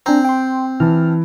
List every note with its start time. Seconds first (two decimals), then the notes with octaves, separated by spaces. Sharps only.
0.06 C4 D4 G#5 A#5
0.25 G5 C6
0.80 E3 A5 F6